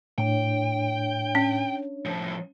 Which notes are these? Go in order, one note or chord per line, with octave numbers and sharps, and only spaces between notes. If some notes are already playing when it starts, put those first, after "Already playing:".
A2 D4 C#5 G5
C#4
A2 F3